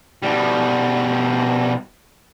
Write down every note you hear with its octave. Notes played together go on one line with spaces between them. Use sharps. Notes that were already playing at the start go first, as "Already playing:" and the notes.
B2 G3